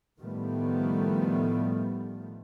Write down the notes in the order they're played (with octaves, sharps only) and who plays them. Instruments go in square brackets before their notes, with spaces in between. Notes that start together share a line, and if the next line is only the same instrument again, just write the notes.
[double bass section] A2 D#3 F3 G3 A3 B3